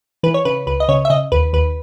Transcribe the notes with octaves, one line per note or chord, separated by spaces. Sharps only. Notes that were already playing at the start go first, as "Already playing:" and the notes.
E3 B4
C#5
C#3 B4
C#2 B4
D#5
C#3 C#5
E5
C#3 D#5
D#2 B4
D#2 B4